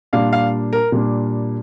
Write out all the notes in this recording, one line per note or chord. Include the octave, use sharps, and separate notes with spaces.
A#2 G3 A#3 D4 F5
F5
A#4
A#2 G3 A#3 D4